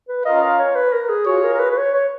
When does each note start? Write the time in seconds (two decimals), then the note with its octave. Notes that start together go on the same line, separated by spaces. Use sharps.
0.08 B4
0.25 C#4 F4 A#4 D#5 F5
0.59 C#5
0.75 B4
0.93 A#4
1.09 G#4
1.26 F4 F#4 G#4 C#5
1.43 A#4
1.54 A#4
1.59 B4
1.71 B4
1.77 C#5
1.94 C#5